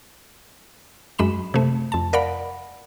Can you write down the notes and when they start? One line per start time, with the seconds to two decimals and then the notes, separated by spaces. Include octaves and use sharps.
1.18 F#2 G#3 B5 E7
1.54 C3 A3
1.92 F2 A5
2.13 A#4 D5 F5 F#5 B5